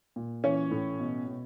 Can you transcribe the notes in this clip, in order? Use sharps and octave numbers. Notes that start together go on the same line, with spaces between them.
A#2
E3 C#4 C#5
A2
B2
B2